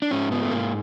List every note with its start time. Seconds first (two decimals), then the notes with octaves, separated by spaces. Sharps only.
0.02 D4
0.11 G#2 C#4
0.32 B3
0.42 A3
0.51 G#2 A#3